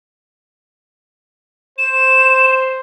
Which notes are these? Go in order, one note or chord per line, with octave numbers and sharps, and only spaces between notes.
C5 E7